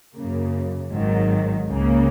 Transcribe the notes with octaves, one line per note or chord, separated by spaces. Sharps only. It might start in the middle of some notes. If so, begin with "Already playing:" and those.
F#2 C#3 A#3
G#1 G#2 D#3 F#3
C#2 C#3 A#3